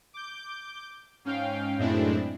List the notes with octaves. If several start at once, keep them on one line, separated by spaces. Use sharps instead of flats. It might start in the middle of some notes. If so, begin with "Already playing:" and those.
D6 G6
G#2 C#4 F5 G5
F#2 A2 G#3 C4 D4 E4